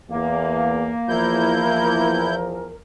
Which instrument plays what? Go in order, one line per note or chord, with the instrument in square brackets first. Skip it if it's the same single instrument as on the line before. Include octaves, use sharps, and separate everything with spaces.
[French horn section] E2 [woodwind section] A#3
[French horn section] E2 F3 [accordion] E4 G6 [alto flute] A#4